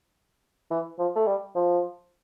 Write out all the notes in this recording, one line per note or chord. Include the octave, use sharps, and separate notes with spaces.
E3
F3
A3
G3
F3